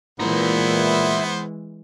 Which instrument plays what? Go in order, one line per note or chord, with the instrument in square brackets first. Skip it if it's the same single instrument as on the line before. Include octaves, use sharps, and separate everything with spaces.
[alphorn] A#2 [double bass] E3 G#3 [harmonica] B3 C5 [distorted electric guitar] E4 A#5